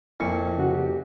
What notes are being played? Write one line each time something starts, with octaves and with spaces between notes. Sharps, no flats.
F2 A#2 E4 C#6
C#3 F#4
G4